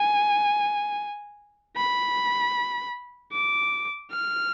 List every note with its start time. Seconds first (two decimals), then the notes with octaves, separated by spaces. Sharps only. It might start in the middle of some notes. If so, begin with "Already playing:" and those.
Already playing: G#5
1.76 B5
3.33 D6
4.11 F6